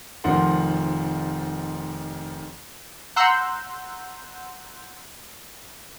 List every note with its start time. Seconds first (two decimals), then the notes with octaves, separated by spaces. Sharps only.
0.24 F1 D#3 F3 F#5 C6
3.16 F#5 A#5 C6 E6 F#6 G6